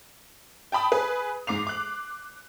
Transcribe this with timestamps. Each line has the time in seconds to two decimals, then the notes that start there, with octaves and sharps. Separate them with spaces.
0.72 G5 A5 B5 D#6
0.92 G#4 B4
1.47 G#2 D6 C7 F7
1.67 D6 F#6